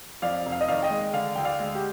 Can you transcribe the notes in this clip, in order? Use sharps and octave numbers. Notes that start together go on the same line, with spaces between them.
F2 D5 F5
F1
F5
D#5
D#3 D5 F5
D#5 G5
G#3
D3 D5 F5
D2 G5
D5 F5
G#3
G4